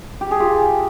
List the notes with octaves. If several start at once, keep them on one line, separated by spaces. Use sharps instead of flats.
G4
G#4
F4 G4